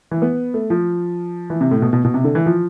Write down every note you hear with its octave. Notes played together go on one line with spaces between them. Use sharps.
E3
B3
A3
F3
E3
C3
A2
B2
B2
B2
C3
D3
E3
F3